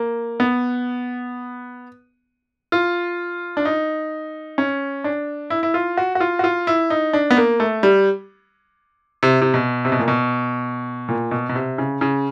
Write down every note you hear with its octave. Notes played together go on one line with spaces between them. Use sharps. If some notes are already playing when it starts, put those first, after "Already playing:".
Already playing: A#3
B3
F4
D4
D#4
C#4
D4
E4
E4
F4
F#4
F#4
F4
F#4
F4
E4
D#4
D4
B3
A#3
A3
G3
C3
C3
B2
C3
B2
A#2
B2
A#2
B2
B2
C3
C#3
C#3